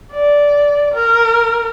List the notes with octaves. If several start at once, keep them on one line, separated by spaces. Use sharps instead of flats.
D5
A#4